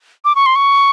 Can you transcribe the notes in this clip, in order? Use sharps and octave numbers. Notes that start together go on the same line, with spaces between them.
D6
C#6
C6
C#6